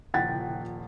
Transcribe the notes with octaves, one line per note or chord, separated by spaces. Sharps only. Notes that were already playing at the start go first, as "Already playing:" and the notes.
D#1 C#3 F3 E4 F#5 G5 A6 B6